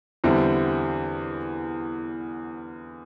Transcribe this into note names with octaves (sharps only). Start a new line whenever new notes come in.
E2 D3 G3 C4 E4